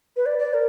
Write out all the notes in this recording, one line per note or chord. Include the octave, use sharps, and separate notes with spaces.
B4
D5
D5
A#4